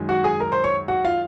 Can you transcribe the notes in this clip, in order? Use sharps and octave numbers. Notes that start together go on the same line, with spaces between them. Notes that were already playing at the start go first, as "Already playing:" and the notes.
Already playing: F#2 D#3 G#3
F#4 F#5
G#4 G#5
A#4 A#5
C5 C6
C#5 C#6
F#4 F#5
F4 F5